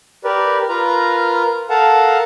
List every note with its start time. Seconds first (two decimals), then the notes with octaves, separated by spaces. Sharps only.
0.24 G4 A#4 B4 D5
0.69 F4 A#4 B4 A#5
1.70 A4 A#4 F5 F#5 A5